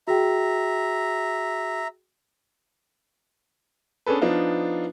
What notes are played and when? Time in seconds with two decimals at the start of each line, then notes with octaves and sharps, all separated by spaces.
0.08 F#4 G#4 E5 G5 A#5
4.06 B3 C#4 D4 G#4 A4 B4
4.21 F3 B3 D4 D#4 F4